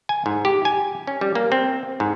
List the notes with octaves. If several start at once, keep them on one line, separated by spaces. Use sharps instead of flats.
G#5
G#2
G4
G#5
C#4
G3
A#3
C4
G#2